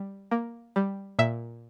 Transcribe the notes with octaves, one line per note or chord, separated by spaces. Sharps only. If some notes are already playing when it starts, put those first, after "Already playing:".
Already playing: G3
A#3
G3
A#2 E5